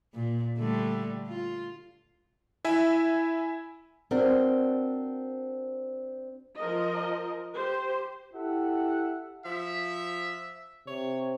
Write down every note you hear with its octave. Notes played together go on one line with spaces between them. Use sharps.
A#2
D3 G3 A3
F4
E4 E5 G#5
C4 D4 F#4 A#4
F3 A#4 D#5
G4 C5
E4 G4 A4 E5 F#5
F3 E5
C3 C#5